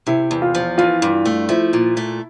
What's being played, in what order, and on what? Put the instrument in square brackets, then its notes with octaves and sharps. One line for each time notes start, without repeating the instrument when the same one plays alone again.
[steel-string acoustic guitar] C3 [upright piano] E4
[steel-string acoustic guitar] E2
[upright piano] F4
[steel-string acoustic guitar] F3
[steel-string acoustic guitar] E3 [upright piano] F4
[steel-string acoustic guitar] G2
A3
[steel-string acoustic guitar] F3 [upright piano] E4
[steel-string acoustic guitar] A#2
A3